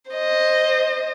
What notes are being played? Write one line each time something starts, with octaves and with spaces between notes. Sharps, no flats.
C5 D#5